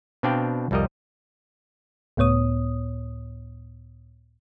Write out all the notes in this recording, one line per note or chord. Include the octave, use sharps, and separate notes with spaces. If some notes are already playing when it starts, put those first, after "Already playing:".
B2 C4 D4 D5 F5 G5
C2 F2 G3 A#4 D#5
C#2 A2 B3 C#5 D#6